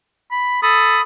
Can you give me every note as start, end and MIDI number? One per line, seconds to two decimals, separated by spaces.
0.31 0.60 83
0.63 0.99 69
0.63 1.01 83
0.63 1.01 87